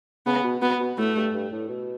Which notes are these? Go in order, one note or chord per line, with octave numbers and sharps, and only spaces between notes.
C#3 B3
B2
B2 B3
B2
A2 A3
G2
G2
A2
B2